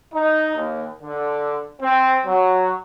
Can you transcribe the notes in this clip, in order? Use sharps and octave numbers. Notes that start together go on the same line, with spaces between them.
D#4
D#2
D3
C4
F#3